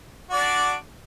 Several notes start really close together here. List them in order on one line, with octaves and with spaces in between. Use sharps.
F#4 D5 D4